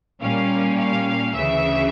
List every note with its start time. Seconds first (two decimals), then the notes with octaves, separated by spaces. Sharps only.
0.21 A#2 G3 A#3 C#4 F5
0.77 F5
1.33 D2 C#3 E3 E5